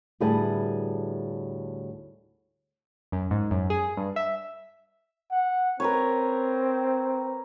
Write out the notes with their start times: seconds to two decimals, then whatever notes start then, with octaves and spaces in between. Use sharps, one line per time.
0.20 D2 A2 G3 G#4 B4 A5
3.12 F#2
3.31 G#2
3.51 F#2
3.70 G#4
3.97 G2
4.16 E5
5.31 F#5
5.80 C4 A#4 B4 C#5